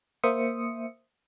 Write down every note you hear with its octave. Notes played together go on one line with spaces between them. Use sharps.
A#3 C5 E5 D#6 C#7